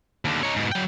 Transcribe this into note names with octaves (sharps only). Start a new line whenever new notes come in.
D#2 D3
D#4 C#5
G#2 B2
F#3 G5